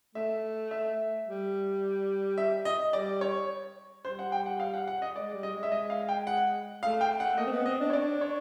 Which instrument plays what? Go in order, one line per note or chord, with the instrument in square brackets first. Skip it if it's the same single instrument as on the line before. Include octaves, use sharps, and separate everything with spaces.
[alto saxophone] A3 [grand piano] E5
[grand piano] E5
[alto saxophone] G3
[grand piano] E5
D#5
[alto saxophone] G3 [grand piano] D5
[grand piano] C#5
[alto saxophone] G3 [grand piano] C5
[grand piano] F#5
G5
F#5
F5
F#5
F#5
D#5
[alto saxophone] G#3 [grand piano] D5
[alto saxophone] G3
[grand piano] D#5
[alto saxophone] G#3
[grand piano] E5
D#5
F5
G5
F#5
[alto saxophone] A3 [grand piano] F5
[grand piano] G5
F#5
[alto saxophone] A#3 [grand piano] D#5
[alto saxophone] C4
B3
[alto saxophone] C4 [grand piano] D#5
[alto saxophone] D4
[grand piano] C#5
[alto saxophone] D4 [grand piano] D5
[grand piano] C#5